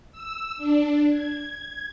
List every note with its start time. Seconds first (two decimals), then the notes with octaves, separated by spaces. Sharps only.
0.12 E6
0.57 D4
1.10 G#6